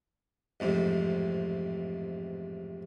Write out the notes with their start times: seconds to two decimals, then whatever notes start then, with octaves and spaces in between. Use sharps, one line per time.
0.60 A1 F2 G#2 C3